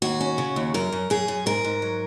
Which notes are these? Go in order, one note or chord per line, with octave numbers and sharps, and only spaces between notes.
D#2 F#4
C#4
C#3
D#2
F#2 A#4
F#2
F#2 G#4
F#2
G#2 A#4
G#2
F#3